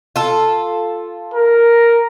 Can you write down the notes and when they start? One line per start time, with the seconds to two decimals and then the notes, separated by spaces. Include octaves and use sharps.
0.16 F4 A4
1.34 A#4